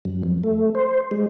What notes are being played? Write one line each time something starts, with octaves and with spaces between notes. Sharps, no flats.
F#2
F2
A3
C5
G#3